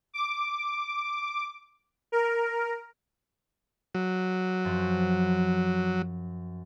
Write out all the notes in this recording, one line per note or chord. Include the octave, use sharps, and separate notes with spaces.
D6
A#4
F#3
F#2 F3